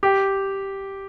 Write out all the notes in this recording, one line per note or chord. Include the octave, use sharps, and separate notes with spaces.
G4